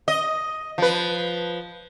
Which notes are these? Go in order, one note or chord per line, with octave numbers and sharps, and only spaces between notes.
D#5
F3 B4